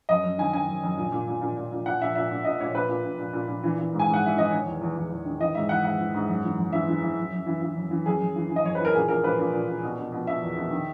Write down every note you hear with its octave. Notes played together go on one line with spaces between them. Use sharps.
F#2 D#5
F#2
D#3 G#5
D#3 G#5
F#2
F#2
A#2
A#2
A#2
A#2
A#2
A#2
A#2 F#5
A#2 E5
A#2 E5
A#2
A#2 D#5
A#2 C#5
A#2 B4
A#2
A#2
A#2
A#2
A#2
E3
E3
G#2
G#5
G#2
F#5
E3 E5
E3 D#5
D#3 C#5
E2
E2
E2
E2
D#3
E3 D#5
G#2 E5
E3 F#5
G#2 F#5
E3
G#2
F#2
E3
F#2
E3 E5
E3
E3
F#2
F#2
E3
E3
F#2
E3
F#2 G#4
F#2
E3
E3
D#5
F#2 C#5
E3 B4
A#4
A#2 G#4
A#2 A#4
A#2 B4
A#2
A#2
A#2
B2
B2
B2
B2 E5
E2
B2
D#3